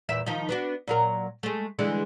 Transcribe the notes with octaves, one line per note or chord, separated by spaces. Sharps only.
E2 A#2 E5
D#3 F3 D#4
B3 D4 F#4
A#2 F#3 A#4
G#3 A3
D3 E3 G#3